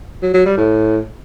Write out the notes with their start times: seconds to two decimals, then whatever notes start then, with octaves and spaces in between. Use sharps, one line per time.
0.22 F#3
0.34 F#3
0.46 G3
0.57 A2